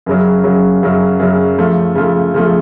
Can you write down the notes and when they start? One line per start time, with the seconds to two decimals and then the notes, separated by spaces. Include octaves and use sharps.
0.06 F#2 C#3 F#3
0.44 F#2 C#3 F#3
0.83 F#2 C#3 F#3
1.19 F#2 C#3 F#3
1.58 C#3 F3 A3
1.95 C#3 F3 A3
2.34 C#3 F3 A3